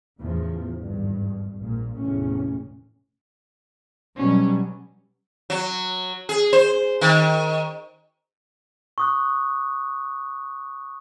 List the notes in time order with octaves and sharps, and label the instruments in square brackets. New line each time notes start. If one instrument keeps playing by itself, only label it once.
[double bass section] E2 A2 C#3 F3
G#1 G2
A#1 A#2
F1 E2 A2 C#4
[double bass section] B2 F#3 G3 [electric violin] C#4
[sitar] F#3
G#4
C5
D#3
[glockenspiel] C#6 D#6 F#6